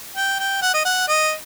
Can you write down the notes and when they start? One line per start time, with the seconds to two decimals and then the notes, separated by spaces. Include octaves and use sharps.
0.16 G5
0.40 G5
0.62 F#5
0.74 D#5
0.85 F#5
1.08 D#5